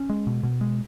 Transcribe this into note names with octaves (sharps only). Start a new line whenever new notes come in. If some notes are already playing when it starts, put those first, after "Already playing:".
Already playing: C#4
G#3
B2
B2
G#3